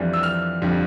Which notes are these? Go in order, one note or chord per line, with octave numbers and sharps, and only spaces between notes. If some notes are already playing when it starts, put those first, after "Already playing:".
Already playing: F2 E3 G3 D4
E6
F6
F2 D3 G3